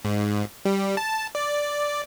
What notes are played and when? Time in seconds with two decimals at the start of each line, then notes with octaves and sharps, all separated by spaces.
0.05 G#2
0.65 G3
0.97 A5
1.35 D5